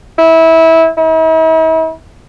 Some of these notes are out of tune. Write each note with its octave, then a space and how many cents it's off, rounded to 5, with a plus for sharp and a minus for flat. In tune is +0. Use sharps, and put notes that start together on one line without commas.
E4 -20
E4 -45